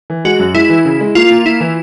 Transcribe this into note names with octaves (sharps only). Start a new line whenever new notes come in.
E3
G#3 F#4
F#2
G#3 E4
E3
C#3
G#3
A#3 F4
A#3
A#3 E4
E3